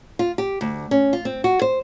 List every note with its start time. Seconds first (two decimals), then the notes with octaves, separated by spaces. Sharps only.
0.19 F4
0.38 G4
0.61 D2
0.91 C#4
1.13 F4
1.25 C4
1.44 F#4
1.62 C5